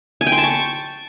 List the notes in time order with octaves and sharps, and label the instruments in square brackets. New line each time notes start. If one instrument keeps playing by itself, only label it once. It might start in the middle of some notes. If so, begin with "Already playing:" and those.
[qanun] G#5
G5
C6
A5
C#6